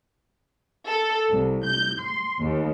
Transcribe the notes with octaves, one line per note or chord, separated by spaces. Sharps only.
A4
C2
G6
C6
D#2